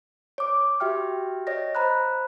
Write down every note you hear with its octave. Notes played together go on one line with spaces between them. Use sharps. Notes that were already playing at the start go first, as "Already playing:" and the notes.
C#5 D6
F#4 G4 E5 G5 F6
C#5 D#5 A#6
C5 A#5 B5 F#6